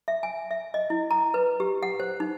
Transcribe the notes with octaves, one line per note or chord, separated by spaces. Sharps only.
E5
G#5
E5
D#5
E4
A#5
B4
G4
F#5
C5
D#4